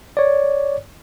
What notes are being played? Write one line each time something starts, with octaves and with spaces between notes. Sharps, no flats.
C#5 D5